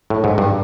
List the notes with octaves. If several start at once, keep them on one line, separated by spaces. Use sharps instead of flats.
A2
G#2
G2